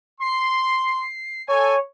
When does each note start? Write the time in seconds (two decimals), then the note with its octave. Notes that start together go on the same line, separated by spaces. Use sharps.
0.21 C6 C7
1.48 A4 C#5 G#5